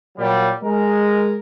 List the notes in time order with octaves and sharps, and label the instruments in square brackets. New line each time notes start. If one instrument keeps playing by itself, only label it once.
[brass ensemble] A#2 F#3 G3
G#3 A#4